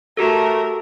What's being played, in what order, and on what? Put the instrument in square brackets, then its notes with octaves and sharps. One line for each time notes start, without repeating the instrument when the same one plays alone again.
[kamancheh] A3 A#4 [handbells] F#4 G4 A4